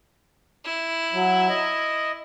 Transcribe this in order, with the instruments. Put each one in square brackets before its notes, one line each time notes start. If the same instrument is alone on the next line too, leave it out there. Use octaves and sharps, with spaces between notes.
[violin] E4
[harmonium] F#3
D#5